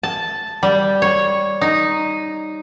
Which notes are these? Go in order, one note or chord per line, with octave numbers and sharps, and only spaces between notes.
A5
G3
C#5
D#4